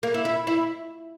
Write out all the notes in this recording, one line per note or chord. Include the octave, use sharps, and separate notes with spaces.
A#3
E4
E4
E4